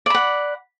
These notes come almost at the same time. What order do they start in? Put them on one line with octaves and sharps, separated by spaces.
D5 B5 F#5